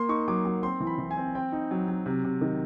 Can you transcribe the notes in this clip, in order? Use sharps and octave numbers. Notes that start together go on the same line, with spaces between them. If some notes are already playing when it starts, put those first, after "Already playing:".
Already playing: A#3 C6
D#4 C#6
F#3 D6
F#3
C4 C6
E3
B5
E3
G#5
C4
C4 G5
D#4
F#3
F#3
C3
C3
D#3